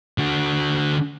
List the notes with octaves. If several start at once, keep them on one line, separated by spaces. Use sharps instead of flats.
D3 F#4